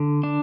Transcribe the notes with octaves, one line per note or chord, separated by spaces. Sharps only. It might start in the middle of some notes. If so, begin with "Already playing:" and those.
Already playing: D3
D4